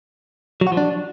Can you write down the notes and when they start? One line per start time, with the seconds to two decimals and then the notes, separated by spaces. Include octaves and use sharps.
0.61 F#3
0.67 F#4
0.72 F3
0.77 D4